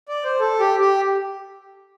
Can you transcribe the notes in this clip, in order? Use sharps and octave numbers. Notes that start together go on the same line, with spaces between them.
D5
C5
A4
G4
G4